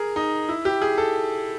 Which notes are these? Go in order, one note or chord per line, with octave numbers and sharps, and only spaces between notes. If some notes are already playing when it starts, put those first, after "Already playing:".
Already playing: G#4 A#4
D#4
E4
G4
G#4
A4